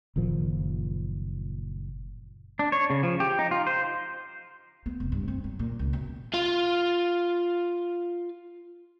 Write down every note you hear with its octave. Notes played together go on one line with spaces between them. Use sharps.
F#1 A#2 D#3 F3
D4
C#5
C#3
F3
G4
D#4
F4
C5
B3
F1
G2
C4
F#3
A#2
C#2
B2
F4 F5